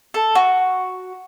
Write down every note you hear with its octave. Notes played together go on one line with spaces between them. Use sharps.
A4
F#4